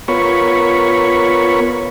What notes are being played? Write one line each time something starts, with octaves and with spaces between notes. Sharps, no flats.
B3 F4 A#4 C#5 B5 C#6